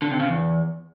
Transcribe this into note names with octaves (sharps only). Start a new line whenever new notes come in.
D3
C3
C#3
E2